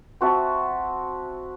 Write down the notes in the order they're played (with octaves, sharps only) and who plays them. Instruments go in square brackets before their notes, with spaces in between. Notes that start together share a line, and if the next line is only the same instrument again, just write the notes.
[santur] C4 F#4 E5 A5